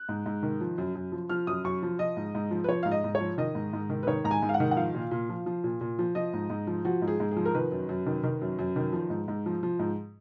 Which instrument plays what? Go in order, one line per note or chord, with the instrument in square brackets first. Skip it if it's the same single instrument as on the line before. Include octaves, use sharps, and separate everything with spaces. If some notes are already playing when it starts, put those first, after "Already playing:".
Already playing: [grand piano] F#6
G#2
G#2
D#3
F3
F#2
F#2
F3
F3 F6
F#2 D#6
F#2 C#6
F3
F3 D#5
G#2
G#2
F3
B4
F3 C#5
G#2 F5
D#5
G#2
C#5
F3
D#3 D#5
G#2
G#2
D#3
B4
D#3 C#5
G#2 A#5
G#5
G#2
F5
F#5
D#3
F#5
F3 F5
A#2
A#2
F3
F3
A#2
A#2
F3
F3 D#5
G#2
G#2
F3
F3 F#4
G#2
G#4
G#2
G#4
F3
A#4
D#3 B4
F#2
F#2
D#3
D#3
F#2
F#2
D#3
F3
G#2
G#2
F3
F3
G#2